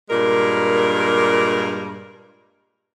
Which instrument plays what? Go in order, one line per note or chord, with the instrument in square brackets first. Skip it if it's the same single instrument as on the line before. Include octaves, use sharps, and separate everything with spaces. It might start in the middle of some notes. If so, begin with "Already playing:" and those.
[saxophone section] G2 A#2 G#3 A#4